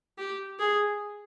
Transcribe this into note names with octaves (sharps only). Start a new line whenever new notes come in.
G4
G#4